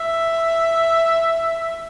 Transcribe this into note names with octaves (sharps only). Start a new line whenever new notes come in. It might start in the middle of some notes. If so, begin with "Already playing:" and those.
Already playing: E5